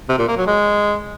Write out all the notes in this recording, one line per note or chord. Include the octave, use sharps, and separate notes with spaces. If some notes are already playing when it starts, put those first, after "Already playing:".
C3
A#2
A#3
F#3
G#3